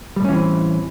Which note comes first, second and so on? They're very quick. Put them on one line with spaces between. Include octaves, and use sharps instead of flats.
G3 A2 C#4 E3 C4